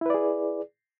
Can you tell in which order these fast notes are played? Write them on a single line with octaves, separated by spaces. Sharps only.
E4 B4 D5 G#4